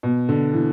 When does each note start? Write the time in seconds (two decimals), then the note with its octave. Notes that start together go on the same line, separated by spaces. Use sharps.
0.03 B2
0.29 D3
0.54 E3